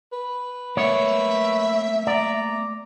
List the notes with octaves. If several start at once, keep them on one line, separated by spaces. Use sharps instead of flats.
B4
A3 A#3 C#5 E5
D5 A#5